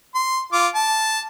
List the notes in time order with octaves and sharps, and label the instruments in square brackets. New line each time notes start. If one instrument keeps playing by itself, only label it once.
[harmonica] C6
F4 D6
A5